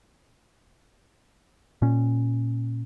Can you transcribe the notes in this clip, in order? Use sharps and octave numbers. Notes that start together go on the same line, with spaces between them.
A#2 C#4